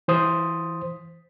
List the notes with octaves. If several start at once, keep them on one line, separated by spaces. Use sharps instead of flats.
E3 C5 D#6